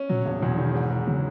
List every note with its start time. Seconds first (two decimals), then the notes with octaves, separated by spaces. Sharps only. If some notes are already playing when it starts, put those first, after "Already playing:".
Already playing: C#4
0.09 A#2 F#3
0.26 E1
0.42 E2 B2
0.58 D#3
0.74 G#2
0.90 G#2
1.07 C#3 F#3